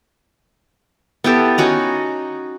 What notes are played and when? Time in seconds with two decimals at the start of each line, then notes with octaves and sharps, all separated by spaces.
1.24 B3 E4 G4 A4
1.58 C#4 D#4 F#4 A#5